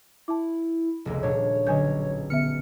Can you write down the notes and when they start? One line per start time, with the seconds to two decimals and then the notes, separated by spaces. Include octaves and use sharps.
0.28 E4 A5 D6
1.05 F1 C#2 A#3
1.23 D#1 A#2 D4 C#5
1.67 B1 D3 C#4 G#5 G6 G#6
2.30 D3 B3 E5 F6 C#7